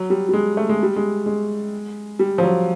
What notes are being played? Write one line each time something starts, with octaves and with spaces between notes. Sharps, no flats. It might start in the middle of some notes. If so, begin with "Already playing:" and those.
Already playing: F#3
G3
G3
G#3
A3
G#3
G3
G#3
G#3
G3
F3
F#3